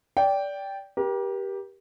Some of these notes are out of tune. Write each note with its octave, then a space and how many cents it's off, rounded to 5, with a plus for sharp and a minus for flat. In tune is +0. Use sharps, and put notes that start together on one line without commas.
D5 -20 G5 +0
G4 +0 A#4 +40